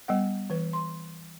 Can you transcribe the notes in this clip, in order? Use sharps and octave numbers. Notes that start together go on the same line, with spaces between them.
G3 B3 F#5
E3 B4
C6